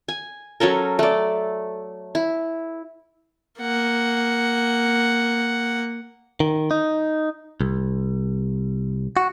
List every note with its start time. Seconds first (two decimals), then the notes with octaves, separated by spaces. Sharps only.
0.08 G#5
0.60 F#3 C#4 A4 A#4
0.99 A3 D5
2.15 E4
3.60 A#3 F#5
6.40 D#3
6.71 D#4
7.61 C2
9.17 F#4